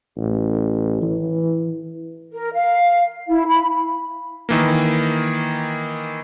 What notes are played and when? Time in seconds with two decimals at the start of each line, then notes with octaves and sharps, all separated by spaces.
0.17 A1
1.02 E3
2.32 A#4
2.54 F5
3.29 E4
3.48 B5
4.49 D#3 E3 A#3